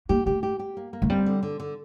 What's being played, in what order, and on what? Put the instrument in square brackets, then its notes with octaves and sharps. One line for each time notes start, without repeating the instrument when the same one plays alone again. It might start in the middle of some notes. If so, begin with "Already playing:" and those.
[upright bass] A#3 [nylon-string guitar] G4
[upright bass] A3 [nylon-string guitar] G4
[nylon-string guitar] G4
G4
A#3
A#3
[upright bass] A3
[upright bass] G3 [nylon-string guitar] C4
[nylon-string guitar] D3
D3
D3